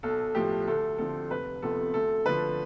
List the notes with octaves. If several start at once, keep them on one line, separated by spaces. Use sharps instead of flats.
B1 A4
A2 F3 G4
D2 A4
D3 F3 C4 A4
F1 B4
F2 C3 F3 B3 A4
D2 A4
D3 F3 B4